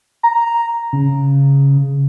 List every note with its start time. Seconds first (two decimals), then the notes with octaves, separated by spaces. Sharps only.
0.23 A#5
0.93 C#3